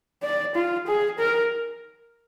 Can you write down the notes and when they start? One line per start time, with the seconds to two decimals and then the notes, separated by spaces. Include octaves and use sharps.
0.23 D5
0.55 F4
0.87 G#4
1.19 A#4